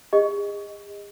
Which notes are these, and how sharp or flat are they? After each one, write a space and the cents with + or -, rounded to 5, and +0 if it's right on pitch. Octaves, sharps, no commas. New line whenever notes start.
G#4 -40 D#5 +0